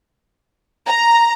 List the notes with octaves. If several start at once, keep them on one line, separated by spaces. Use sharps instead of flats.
A#5